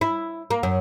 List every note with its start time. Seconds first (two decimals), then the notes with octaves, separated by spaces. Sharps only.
0.01 E4
0.50 A#3
0.63 F#2